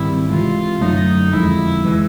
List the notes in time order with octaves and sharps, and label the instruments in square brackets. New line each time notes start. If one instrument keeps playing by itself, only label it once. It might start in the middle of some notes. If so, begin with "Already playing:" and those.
Already playing: [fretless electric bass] G#2 D#3 G3 C4 [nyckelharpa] E4
[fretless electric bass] C3 E3 G#3 [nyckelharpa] F4
[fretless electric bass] F#2 D3 F#3 A3 [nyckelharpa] D#4
[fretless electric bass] F2 D3 F3 G#3 [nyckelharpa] E4
[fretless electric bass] E3 G#3